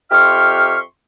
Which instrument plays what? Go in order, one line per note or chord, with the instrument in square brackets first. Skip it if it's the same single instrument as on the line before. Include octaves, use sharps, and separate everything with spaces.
[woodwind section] F2 G4 E5 C6 C#6 F6